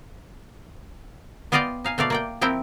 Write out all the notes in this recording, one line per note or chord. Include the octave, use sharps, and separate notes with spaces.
B3 F4 D5 D#5 F5 G5
D#4 F5 G#5
B2 A3 A#4 D5 F5
A#3 D5 G5
F3 C4 E4 A#4 G5